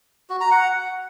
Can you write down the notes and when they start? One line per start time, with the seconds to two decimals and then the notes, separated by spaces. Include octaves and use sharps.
0.30 F#4
0.40 A#5
0.51 F#5